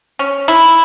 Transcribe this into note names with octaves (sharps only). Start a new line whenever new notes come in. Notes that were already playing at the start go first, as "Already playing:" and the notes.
C#4
E4